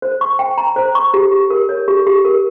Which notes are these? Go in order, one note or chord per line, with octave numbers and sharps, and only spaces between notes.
C5
C#6
G5
A#5
C5
C#6
G4
G4
A#4
C#5
G4
G4
A#4